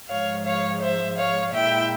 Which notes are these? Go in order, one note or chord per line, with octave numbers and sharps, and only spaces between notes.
G#2 F3 G#3 C#5 F5
C#5 F5
C5 E5
C#5 F5
A#2 G#3 E4 E5 G5